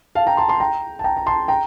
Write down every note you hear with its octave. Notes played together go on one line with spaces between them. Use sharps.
F5 A5
G5 A#5
A5 C6
A5 C6
G5 A#5
A5
G5 A#5
A#5
A5 C6
G5 A#5